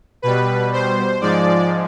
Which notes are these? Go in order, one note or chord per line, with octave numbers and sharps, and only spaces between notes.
B2 G3 B4
C5
G#2 F3 G#3 D5